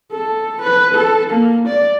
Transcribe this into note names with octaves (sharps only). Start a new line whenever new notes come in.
A4
B4
A4
A#3
D5